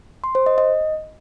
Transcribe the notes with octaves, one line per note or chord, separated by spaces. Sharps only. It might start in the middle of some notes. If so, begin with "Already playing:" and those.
C6
C5
D#5
D#5